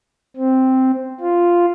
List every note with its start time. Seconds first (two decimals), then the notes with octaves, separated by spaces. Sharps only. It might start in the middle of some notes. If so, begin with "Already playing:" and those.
0.37 C4
1.20 F4